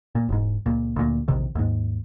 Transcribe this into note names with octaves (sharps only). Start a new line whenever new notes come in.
A#2
E1 G#2
C#2 A#2
D2 A#2
A#1 E2 C3 D#3
D#2 G#2